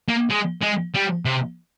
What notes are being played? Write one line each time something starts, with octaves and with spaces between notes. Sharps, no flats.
A#3
G#3
G#3
G3
C3